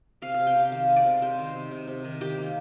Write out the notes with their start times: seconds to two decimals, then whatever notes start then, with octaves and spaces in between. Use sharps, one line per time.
0.22 C3 F5
0.34 F5
0.39 C3
0.47 G5
0.56 C3 F5
0.72 D#3 F5
0.88 G#3
0.96 D5
1.06 C3
1.21 C3 C5
1.38 D#3
1.55 C3
1.71 C3
1.88 C3
2.04 D#3
2.21 D#3 G4
2.38 A#3